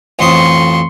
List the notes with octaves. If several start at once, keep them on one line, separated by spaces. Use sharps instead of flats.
A1 F2 C6 C#6 D#6